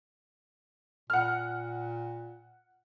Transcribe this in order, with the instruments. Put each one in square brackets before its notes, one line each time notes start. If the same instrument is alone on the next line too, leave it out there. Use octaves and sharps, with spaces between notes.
[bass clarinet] A#2 [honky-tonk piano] F#5 F6